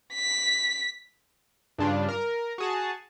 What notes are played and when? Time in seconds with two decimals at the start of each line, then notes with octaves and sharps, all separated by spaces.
0.14 B6
1.78 G2 C#3 D4 F4
2.09 A#4
2.58 F#4 G#4 A5